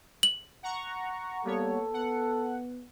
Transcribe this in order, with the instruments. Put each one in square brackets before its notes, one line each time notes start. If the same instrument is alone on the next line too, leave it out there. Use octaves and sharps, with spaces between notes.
[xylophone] F#7
[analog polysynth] F#5 A#5 C#6
[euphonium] G3 [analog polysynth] A#3 B3 C#5 [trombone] A4
[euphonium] B3 [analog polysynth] F#5